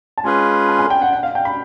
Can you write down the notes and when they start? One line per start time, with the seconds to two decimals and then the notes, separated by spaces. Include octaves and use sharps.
0.18 A5
0.23 G#3 C#4 F4 G#4 B4 G#5
0.69 A5
0.79 G#5
0.90 G5
1.02 F#5
1.13 F#5
1.23 F5
1.35 G5
1.45 B5